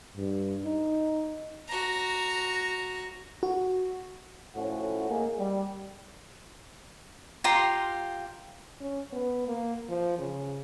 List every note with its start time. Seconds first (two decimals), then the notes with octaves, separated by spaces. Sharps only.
0.17 G2
0.65 D#4
1.68 F#4 A#5
3.43 F#4
4.56 A2 F3 C#4 F#4 A4
5.10 A#3 D#4 G#4
5.38 G3
7.44 F4 G4 A#5 C6
8.81 C#4
9.13 B3
9.48 A#3
9.89 F3
10.18 C#3